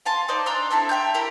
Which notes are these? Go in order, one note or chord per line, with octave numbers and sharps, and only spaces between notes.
F5 G#5 A5 C6
D#4 C5 D5
D4 A#5 C6 E6
C4 D4 E4 A4
E5 G5 A#5 G6
E4 G4 A#4 A#5